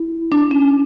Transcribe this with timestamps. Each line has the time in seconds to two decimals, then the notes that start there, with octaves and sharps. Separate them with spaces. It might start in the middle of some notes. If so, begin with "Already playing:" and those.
Already playing: E4
0.32 D4
0.51 C#4